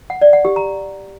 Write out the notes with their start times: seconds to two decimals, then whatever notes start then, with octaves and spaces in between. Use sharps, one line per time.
0.10 F#5
0.21 D5
0.33 F#5
0.45 G4
0.56 A#5